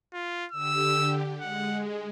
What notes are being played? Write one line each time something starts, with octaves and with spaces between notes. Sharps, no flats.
F4
D3 G4 E6
G#3 F#5